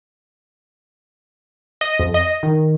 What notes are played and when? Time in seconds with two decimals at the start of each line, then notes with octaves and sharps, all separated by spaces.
1.81 D#5
1.99 F2
2.14 D#5
2.43 D#3